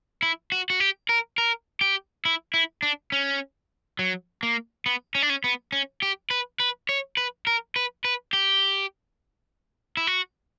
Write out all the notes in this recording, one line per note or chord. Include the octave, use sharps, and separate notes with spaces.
E4
F#4
F#4
G4
A#4
A#4
G4
E4
E4
D4
C#4
F#3
A#3
B3
C#4
D4
C#4
B3
C#4
G4
B4
B4
C#5
B4
A#4
B4
B4
G4
E4
F#4